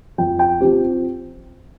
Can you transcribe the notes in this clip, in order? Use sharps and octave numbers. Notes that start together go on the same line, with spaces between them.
F2 G5
G5
F3 C4 G4